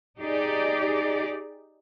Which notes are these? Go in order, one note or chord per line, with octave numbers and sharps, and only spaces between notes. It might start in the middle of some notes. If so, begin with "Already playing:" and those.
D#4 G4 G#4 D5